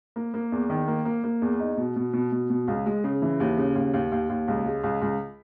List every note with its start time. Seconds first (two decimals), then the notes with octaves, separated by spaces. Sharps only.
0.16 A#3
0.34 A#3
0.52 E2
0.70 D#3
0.88 A#3
1.05 A#3
1.24 A#3
1.42 E2
1.59 D#4
1.77 B2
1.96 B2
2.13 B2
2.32 B2
2.50 B2
2.68 C#2
2.86 G#3
3.04 C#3
3.22 E3
3.40 D#2
3.58 C#3
3.75 D#2
3.94 D#2
4.12 D#2
4.29 D#2
4.48 C#2
4.66 G#3
4.84 C#2
5.02 C#2